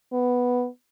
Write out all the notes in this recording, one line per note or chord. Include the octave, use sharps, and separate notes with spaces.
B3